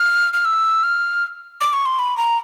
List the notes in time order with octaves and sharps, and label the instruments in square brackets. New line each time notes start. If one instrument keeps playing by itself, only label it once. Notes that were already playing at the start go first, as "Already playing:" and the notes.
Already playing: [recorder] F6
F6
E6
F6
D6
C#6
C6
B5
A#5